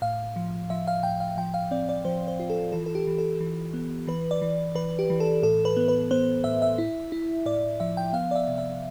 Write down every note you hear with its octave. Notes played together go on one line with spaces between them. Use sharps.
A2 F5
F3
F3 E5
F5
A2 G5
F5
F3 G5
F5
C4 D5
D5
F3 C5
C5
F4
A4
E3 A4
A4
G4
E3
A4
E3
B3
E3 B4
D5
E3
E3 B4
G4
E3
A4
A2 A4
B4
B3
B4
B3 C5
A2 E5
E5
E4
E4
A2 D5
F3 E5
G5
B3 F5
D5
E5
C3
E5